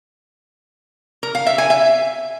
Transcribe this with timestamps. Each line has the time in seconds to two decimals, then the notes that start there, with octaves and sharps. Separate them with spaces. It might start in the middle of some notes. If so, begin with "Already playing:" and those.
1.23 A#4
1.35 F5
1.46 E5
1.58 G#5
1.70 E5